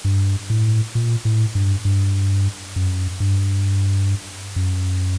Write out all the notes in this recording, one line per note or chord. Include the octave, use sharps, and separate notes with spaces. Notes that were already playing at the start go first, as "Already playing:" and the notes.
G2
A2
A#2
A2
G2
G2
F#2
G2
F#2